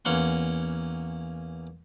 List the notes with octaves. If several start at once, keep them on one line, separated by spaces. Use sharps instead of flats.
E2 A#3 C#4 F#5 C6